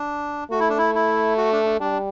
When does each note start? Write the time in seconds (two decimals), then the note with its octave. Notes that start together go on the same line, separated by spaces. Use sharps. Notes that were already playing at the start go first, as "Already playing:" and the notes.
Already playing: D4
0.51 A3 F#4
0.60 E4
0.69 D4
0.78 E4
0.95 E4
1.38 F#4
1.52 D4
1.65 D4
1.80 G3 D4